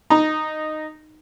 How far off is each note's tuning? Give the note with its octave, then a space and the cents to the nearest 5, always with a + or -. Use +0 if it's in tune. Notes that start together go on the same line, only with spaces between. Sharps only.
D#4 -10 A#5 +0